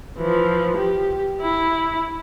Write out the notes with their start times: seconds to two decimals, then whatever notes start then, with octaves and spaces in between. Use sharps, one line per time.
0.18 E3 F3
0.77 G4
1.41 E4